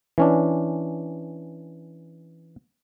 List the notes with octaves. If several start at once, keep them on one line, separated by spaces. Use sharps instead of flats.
E3 C#4 D4